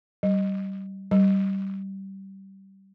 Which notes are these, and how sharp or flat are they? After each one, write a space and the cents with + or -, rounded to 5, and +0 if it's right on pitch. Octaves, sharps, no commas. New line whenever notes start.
G3 -25
G3 -20